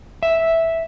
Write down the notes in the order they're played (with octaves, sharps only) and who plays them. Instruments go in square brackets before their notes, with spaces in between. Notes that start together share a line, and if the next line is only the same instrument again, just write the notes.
[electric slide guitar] E5